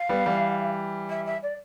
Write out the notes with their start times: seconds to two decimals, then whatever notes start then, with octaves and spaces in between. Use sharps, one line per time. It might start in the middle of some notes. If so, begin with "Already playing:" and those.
Already playing: F5
0.09 G3 B3
0.26 E3 G3
1.09 E5
1.25 E5
1.42 D5